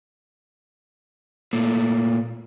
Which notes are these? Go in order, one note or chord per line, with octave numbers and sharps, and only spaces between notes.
A#2 A3